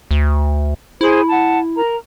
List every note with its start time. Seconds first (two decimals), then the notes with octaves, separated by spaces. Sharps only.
0.11 D2
1.01 E4 G#4 C5
1.29 F#5 A5
1.76 A#4 A#5